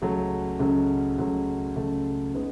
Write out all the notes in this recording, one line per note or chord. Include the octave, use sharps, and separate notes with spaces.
C#2 C#3 F#3 A3
C#2 C#3 F#3 A3
C#2 C#3 F#3 A3
C#2 C#3 F#3 A3
C#3 G#3 B3 D#4